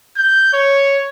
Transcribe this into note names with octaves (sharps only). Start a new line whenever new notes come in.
G6
C#5